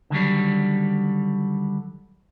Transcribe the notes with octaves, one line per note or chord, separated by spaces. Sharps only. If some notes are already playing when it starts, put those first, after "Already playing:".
D3 D#3 F#3 G3